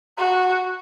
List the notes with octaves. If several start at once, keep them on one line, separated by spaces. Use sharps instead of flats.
F#4